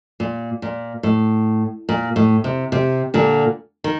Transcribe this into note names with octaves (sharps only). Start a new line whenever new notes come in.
A#2
A#2
A2
A#2
A2
C3
C3
A#2 D3
D#3